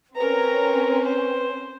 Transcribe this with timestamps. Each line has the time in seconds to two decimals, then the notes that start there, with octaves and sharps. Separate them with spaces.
0.16 C4 C#4 A#4 B4 A#5
1.05 C5